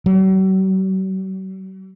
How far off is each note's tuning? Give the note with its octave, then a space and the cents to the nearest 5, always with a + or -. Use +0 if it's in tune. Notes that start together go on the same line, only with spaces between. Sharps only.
F#3 +45